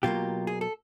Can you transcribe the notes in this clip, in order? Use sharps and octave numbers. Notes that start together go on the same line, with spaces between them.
B2 F#3 A#3 F4 G4
G#4
A4